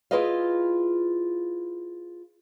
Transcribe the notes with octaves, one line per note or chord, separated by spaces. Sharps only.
E4 F4 G#4 B4 D#5 F5